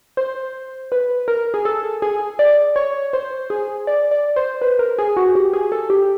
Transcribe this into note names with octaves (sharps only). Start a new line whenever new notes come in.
C5
B4
A#4
G#4
A4
G#4
D5
C#5
C5
G#4
D5
D5
C5
B4
A#4
G#4
F#4
G4
G#4
A4
G4